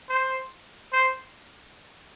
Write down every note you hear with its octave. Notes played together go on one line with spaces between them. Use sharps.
C5
C5